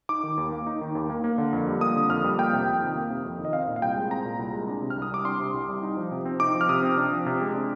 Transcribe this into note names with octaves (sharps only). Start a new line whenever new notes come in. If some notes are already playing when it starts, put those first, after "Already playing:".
D#4 D6
D#3
D#2
A#3
D#4
D#3
D#2
A#3
A#3
D3
F2
G3
A#3 D#6
D3
F2 F6
G3
A#3 G5
C3
F2
D#3
A#3
C3
F2
D#3
D#5
C4 F5
A#2
F5
C2 G5
G#3
C4 A#5
A#2
C2
G#3
D4
C3
F6
C2
D#6
G3 D6
D4 C6
C3
C2
G3
D#4
F3
C3
C4
D#4 D6
F3
F6
C3 D#6
C4
D4
F3
C3
G#3
D4